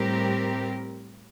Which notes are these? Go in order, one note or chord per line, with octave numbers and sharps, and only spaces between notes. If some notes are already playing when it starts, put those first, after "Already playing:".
Already playing: A2 G3 C4 G4 A#4